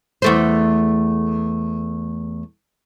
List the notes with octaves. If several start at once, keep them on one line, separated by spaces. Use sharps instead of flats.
E2 A3 C5